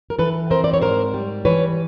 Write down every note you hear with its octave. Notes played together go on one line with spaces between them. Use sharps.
A#4
E3 A4 B4
C4 A#4 C5
D5
C#5
G#2 A#4 C5
G3
E3 B4 C#5